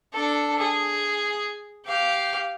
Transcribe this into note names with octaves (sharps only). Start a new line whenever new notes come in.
D4 A4
G#4
G4 F5